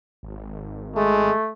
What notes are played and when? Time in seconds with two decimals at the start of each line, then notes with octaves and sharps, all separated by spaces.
0.23 G#1
0.96 G#3 A3